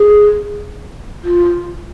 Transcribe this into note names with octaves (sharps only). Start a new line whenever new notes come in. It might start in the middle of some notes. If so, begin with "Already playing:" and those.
Already playing: G#4
F4